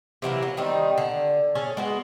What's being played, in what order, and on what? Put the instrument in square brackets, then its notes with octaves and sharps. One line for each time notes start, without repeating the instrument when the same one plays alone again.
[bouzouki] C3 E3 F#3 A#3
F#3
D#3 G3 C4 D#4
D3
C#4 G#4 A4 C#5
G#3 B3 F#4